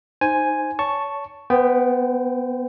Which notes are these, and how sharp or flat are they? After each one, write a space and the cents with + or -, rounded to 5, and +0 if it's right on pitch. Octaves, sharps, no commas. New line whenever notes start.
D#4 +0 C5 +0 G#5 +0
C#5 +30 A5 +0 C#6 +0
B3 +0 C5 -40 G5 +0